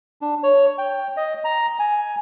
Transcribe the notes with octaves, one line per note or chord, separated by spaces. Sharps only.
D4
C#5
G5
D#5
A#5
G#5